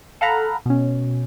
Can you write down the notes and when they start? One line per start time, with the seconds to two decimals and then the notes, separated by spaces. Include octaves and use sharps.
0.21 A4 F5 F#5 A#5 B5
0.66 B2 C#4